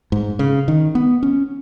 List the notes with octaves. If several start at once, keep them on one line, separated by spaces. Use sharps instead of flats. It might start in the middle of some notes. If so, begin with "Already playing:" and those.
G#2
C#3
D#3
B3
C#4